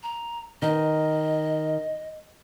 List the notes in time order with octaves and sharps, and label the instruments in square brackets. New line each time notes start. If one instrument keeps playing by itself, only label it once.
[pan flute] A#5
[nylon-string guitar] D#3 [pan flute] D#5